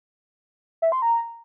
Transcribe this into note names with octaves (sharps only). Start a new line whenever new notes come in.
E5
C6
A#5